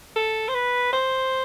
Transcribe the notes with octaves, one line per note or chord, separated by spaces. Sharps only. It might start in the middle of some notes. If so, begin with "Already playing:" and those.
A4
C5
B4
C5